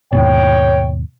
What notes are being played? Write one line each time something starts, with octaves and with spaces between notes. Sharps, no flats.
D#2 G#2 B2 C#5 G5